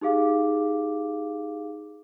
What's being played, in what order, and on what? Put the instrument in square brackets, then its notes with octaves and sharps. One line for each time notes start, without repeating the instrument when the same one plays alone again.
[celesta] D#4 G4 G#4 F5 D6